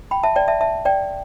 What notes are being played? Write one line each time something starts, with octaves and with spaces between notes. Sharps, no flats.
G5 B5
E5 A5
D5 G5
E5 A5
E5 A5
D5 G5